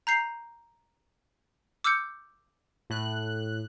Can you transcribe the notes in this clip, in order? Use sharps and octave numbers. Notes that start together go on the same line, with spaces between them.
A#5 G6 C7 F7
D6 E6 F6 G6 C#7
A2 F#6